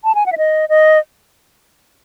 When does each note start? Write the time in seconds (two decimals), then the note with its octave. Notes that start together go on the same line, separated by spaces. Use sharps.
0.04 A5
0.15 G#5
0.26 F#5
0.32 E5
0.38 D#5
0.69 D#5